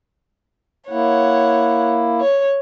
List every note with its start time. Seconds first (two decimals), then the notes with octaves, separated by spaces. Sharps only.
0.91 A#3 E4 C#5 F#5
2.21 C#5